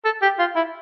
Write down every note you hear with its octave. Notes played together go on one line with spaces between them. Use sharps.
A4
G4
F4
E4